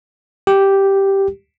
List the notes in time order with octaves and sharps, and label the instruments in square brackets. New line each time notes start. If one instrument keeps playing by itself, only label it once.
[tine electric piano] G4